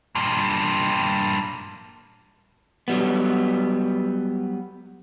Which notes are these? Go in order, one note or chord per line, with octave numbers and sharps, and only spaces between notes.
G2 A#2
F#3 G3 B3